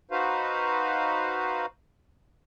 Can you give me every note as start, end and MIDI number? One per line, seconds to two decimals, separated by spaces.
0.11 1.66 63
0.11 1.66 66
0.11 1.66 71
0.11 1.66 72
0.11 1.66 77